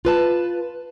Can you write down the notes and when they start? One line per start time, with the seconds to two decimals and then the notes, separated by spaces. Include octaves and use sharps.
0.05 F4 B4 A5